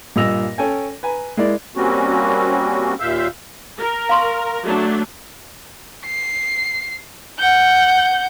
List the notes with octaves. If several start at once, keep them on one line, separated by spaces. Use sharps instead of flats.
G2 A#2 D#5 E6 A#6 F7
C#4 A4 G5 G#5
B4 G#5 A#5
G#3 E4 A#4 D5
G3 A#3 C4 C#4 F#4
D#2 A#2 E5 F5 E6 G6
A#4
F5 C6 C#6
F#3 A3 D4
C7
F#5 G6